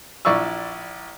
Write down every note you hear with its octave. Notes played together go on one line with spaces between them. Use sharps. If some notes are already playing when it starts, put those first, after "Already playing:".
A#1 E4 D5 C#6 E6